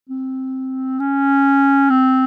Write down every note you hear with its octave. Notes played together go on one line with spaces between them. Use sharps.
C4
C#4
C4